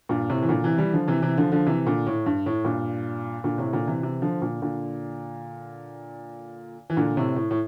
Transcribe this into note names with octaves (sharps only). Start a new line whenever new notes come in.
G2 A#2
A2 C3
E3
A#2 D3
C3 E3
E3 G3
D3 F3
C3 E3
C3 E3
D3 F3
D3 F3
C3 E3
A#2 D3
A2
G2
A2
G2 A#2
A#2 D3
A2 C3
A#2 D3
C3 E3
C3 E3
D3 F3
A#2 D3
A#2 D3
E3
A#2 D3
A2 C3
A2
A2